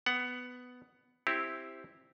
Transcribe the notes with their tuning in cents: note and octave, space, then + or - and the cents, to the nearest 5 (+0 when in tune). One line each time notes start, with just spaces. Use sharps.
B3 +10 F#5 +10
C4 +0 E4 +0 G4 +0